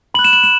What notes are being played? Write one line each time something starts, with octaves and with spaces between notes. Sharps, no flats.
B5 F#6 F#7
E7
F#7
E7